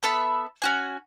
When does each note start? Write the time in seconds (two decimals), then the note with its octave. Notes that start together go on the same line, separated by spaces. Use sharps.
0.03 B3 A4 E5 B5
0.62 C#4 F#4 G#5